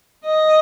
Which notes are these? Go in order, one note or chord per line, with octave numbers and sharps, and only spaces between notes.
D#5